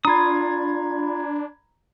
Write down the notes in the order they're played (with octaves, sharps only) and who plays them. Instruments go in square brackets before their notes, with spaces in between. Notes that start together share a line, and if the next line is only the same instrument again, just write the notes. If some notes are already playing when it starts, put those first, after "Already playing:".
[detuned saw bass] D4 [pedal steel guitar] F4 D#6 [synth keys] A#5 B5 G#6